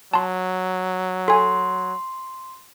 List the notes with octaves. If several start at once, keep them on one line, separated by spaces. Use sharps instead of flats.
F#3 A5 C6
A4 G#5 C6